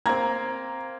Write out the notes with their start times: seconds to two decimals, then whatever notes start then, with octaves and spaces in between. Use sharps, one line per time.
0.06 A#3 C4 A#5 G#6